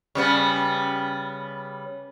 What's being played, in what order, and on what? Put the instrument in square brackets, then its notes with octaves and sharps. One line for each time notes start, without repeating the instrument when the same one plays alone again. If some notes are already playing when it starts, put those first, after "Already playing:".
[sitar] C#3 G3 B3